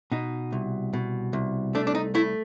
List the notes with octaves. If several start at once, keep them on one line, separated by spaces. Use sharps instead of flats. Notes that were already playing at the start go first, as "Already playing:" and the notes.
B2 D#4
C2
B2
C2
A3 D4
D4
D#4
A3 E4